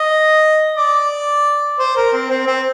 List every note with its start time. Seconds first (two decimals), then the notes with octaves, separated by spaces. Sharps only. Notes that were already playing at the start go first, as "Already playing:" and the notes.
Already playing: D#5
0.77 D5
1.79 C5
1.96 A#4
2.13 C4
2.30 C4
2.47 C4